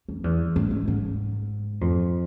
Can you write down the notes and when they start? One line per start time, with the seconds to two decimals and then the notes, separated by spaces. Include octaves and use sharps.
0.09 F2
0.24 E2
0.56 G#2
0.71 G#2
0.88 G#2
1.81 F2